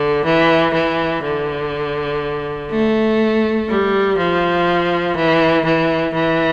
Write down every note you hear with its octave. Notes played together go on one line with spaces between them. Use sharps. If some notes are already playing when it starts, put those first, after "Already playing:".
Already playing: D3
E3
E3
D3
A3
G3
F3
E3
E3
E3